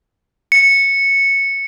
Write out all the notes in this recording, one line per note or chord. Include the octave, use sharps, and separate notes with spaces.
C#7